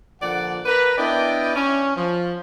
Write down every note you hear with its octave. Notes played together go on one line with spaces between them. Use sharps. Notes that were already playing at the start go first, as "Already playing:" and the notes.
A#2 D3 F3 D5 F#5
A#4 B4
B3 D4 E4 D5 D#5 G5
C#4
F3